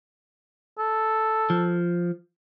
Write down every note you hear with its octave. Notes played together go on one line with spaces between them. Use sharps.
A4
F3